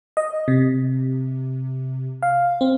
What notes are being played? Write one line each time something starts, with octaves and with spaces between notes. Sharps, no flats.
D#5
C3
F5
C4